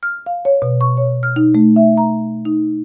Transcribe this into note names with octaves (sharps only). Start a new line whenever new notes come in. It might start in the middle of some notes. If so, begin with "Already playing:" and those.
F6
F5
C#5
B2
C#6
C#5
F6
D#4
A3
E5
A#5
D#4